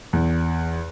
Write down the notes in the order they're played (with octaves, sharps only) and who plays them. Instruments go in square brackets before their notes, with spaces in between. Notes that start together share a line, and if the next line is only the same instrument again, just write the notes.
[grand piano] E2